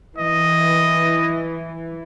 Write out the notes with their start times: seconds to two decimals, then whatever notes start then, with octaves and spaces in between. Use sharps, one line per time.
0.18 E3 D#5